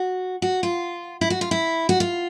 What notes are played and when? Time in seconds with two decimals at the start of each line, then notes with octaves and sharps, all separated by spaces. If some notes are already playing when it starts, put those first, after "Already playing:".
Already playing: F#4
0.42 F#4
0.63 F4
1.21 E4
1.30 F#4
1.41 F4
1.51 E4
1.89 F#4
2.00 F4